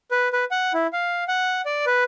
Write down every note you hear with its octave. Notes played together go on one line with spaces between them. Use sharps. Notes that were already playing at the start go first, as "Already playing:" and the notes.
B4
B4
F#5
E4
F5
F#5
D5
B4